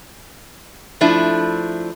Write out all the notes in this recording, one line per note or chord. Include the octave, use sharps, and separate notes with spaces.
F3 A3 D4 E4